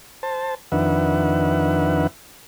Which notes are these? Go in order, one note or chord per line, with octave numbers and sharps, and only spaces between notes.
C5 A5
F2 D#3 D4 B4 E5 F#5